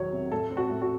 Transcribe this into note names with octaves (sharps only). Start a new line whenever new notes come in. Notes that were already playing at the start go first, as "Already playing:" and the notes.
Already playing: E2 D#3 F#3 C#5
C3
A2 A4
C4
F#4
A2
F#4